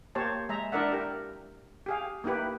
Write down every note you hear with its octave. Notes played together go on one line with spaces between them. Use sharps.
A#3 G4 C5 C#5 A5
G#3 E5 A#5
D4 E4 A#4 D5 E5 F#5
G4 A#4
G4 G#4 F5
A#3 D#4 E4 G4 B4